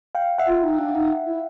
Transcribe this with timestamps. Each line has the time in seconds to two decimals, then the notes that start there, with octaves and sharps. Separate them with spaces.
0.15 F5 G5
0.38 E5 F#5
0.47 F4
0.63 D#4
0.78 D4
0.95 D#4
1.26 E4